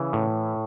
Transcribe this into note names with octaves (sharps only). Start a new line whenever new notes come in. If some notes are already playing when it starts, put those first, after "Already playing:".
Already playing: C#3 E3
A2